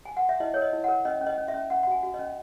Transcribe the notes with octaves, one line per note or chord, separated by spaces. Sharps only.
G#5
F#5
E5
E4 D#5
A#4 C#5
D#5
E4
F#5
A#4
C#4 D#5
C#4
D#5
C#4
E5
C#4
C#4 F#5
F#5
F#4 G#5
F#4
D#5
C#4